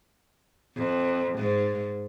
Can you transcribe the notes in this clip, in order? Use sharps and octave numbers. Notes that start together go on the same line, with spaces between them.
F2
G#2